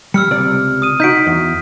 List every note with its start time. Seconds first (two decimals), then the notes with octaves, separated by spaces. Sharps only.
0.14 G3 E6 F6 C#7
0.31 C#2 C3 D5
0.82 D#6 D#7
1.00 D#4 F#4 G6 B6 D7
1.27 E2